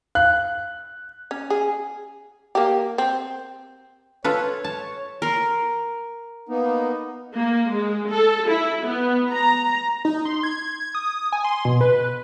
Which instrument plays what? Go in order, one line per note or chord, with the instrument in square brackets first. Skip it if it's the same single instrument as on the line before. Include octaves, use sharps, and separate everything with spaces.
[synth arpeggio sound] F5 [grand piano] F#6
[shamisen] C#4
G#4
A#3 G4
C4
[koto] F4 A4 B4 [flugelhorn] C#5
[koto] A5
[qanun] A#4 C6
[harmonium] A#3 B3 D#4
[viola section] A#3
G#3
A4
E4
B3
A#5
[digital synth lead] D#4
C6
G#6
D#6
G#5
C6
B2
B4